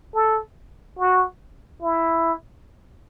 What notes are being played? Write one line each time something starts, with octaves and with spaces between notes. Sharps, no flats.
A4
F#4
E4